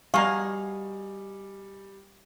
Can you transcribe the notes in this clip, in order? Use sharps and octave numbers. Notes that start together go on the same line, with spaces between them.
B2 G3 G#4 D5 F5 A#5 C#6